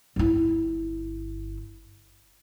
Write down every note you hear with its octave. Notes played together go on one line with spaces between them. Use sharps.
G1 E4